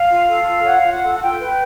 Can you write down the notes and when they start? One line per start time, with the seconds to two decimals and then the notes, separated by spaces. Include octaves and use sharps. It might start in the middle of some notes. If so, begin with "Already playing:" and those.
Already playing: F5
0.08 F4
0.27 A4
0.46 F4
0.64 C#5 F#5
0.76 F5
0.83 F4
0.89 F#5
1.02 A4
1.14 F#5
1.21 F4 G5
1.40 B4